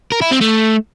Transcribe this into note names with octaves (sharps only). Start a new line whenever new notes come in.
A#4
E4
C4
A3